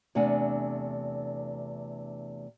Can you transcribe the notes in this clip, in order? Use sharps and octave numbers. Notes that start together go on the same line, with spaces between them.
E2 C3 A3 D4 F#5 G#5